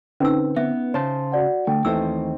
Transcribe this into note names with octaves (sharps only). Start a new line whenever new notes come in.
D3 C4 C#4 D#4 B4 E6
B3 E5
C#3 C5 C#5 A5 C6
F#4 D5 F#5
D3 A3 G5
D#2 D#3 E3 A3 C4 C5 E6